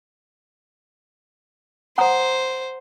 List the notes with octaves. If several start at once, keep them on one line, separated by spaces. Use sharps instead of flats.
C5 F#5 A#5 D#6